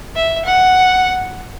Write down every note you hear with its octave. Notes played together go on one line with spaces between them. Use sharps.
E5
F#5